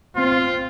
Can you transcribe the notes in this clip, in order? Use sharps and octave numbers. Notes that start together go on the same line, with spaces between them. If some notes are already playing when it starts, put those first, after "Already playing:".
C4 F4